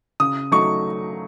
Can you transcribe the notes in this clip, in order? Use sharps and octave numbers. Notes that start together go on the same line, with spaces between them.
C#3 D#6
F#3 A3 D#4 C#6